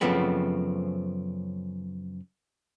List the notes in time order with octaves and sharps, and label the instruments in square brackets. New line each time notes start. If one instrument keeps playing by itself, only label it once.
[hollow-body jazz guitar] F#2 C#3 F3 A3 B3 C4